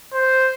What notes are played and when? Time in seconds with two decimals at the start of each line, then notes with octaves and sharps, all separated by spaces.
0.13 C5